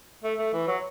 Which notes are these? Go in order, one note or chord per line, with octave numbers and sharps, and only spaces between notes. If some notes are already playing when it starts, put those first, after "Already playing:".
A3
A3
E3
F#3